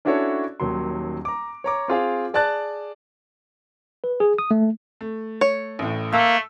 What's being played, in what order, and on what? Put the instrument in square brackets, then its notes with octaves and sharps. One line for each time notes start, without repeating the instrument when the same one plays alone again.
[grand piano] C#4 D4 E4 F#4 A4 C#5
D#1 D#2 F#3 C6
A#5 D6
C#5 A#5 D6
C4 F4 G#4 F5
G#4 D5 A5 F#6 A6
[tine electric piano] B4
G#4
D#6
A3
[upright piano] A3
[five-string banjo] C#5
[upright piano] A1 A2
[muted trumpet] A3 [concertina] A#3 [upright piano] E6